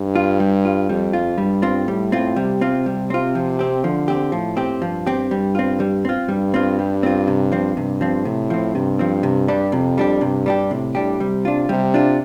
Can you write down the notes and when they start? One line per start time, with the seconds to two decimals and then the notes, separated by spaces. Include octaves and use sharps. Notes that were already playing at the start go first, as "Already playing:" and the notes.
Already playing: G2
0.15 F4
0.40 G3
0.65 F4
0.89 F2 G3
1.13 F4
1.38 G2 G3
1.62 C4 F4
1.87 A2 G3
2.12 C4 F4
2.36 C3 G3
2.61 C4 F4
2.86 G3
3.10 C4 F4
3.35 F3
3.59 C4 G4
3.84 D3 F3
4.08 C4 G4
4.32 A2 F3
4.57 C4 G4
4.82 G2 F3
5.07 C4 G4
5.31 G2 G3
5.55 C4 F4
5.80 G3
6.05 C4 F4
6.28 G2 G3
6.54 C4 F4
6.79 G3
7.03 C4 F4
7.28 C3
7.52 F3 C4
7.76 G2 C3
8.01 F3 C4
8.25 A2 C3
8.50 F3 C4
8.75 G2 C3
8.99 F3 C4
9.23 C3
9.48 G3 D4 G4
9.72 F2 C3
9.98 G3 D4 G4
10.21 G2 C3
10.46 G3 D4 G4
10.71 A2 C3
10.95 G3 D4 G4
11.20 C3 G3
11.45 D4 F4
11.69 C3 G3
11.94 D4 F4